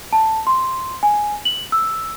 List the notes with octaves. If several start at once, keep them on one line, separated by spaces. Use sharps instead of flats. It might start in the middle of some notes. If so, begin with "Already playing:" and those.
A5
C6
G#5
F#7
E6